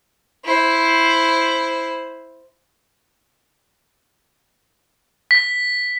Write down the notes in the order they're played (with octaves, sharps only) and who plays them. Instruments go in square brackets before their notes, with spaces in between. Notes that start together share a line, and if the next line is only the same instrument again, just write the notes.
[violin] E4 C5
[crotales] B6